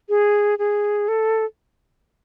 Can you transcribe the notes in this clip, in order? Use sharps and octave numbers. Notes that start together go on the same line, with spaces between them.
G#4
G#4
A4